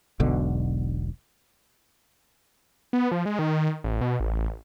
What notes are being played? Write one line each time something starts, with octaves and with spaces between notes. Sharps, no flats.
E1 B1 B2 D3
B3
F3
G#3
D#3
A1
B2
A1